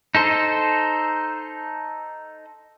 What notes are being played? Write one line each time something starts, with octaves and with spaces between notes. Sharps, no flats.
D#4 A4 C5